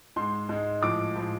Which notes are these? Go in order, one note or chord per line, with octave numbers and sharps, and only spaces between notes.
G#2 G#3 C6
G#2 G#3
A2 F3 G#3 D6
A2 F3 G#3